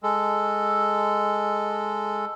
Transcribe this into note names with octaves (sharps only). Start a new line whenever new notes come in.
G#3 A4